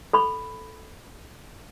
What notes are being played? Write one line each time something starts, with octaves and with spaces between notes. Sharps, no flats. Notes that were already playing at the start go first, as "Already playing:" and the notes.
A4 B5 C#6